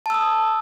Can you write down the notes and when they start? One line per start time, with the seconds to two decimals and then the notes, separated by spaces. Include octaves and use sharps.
0.06 A5
0.10 E6
0.14 D#6